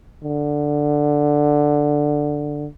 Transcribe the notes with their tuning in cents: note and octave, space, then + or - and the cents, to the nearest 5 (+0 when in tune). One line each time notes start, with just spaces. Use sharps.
D3 +5